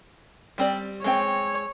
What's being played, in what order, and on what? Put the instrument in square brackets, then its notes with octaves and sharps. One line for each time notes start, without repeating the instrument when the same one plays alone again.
[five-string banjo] G3 C4 D5
[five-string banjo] G#3 C4 G5 [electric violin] C#5